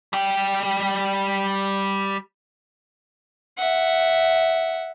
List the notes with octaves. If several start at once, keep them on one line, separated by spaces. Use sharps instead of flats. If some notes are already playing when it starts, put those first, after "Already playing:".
G3 G5
E5 F#5